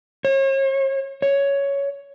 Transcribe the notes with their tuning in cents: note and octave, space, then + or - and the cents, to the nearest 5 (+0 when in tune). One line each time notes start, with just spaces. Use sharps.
C#5 -40
C#5 +10